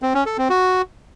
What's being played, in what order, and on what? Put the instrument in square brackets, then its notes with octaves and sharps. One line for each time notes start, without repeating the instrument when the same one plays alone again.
[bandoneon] C4
C#4
A4
C4
F#4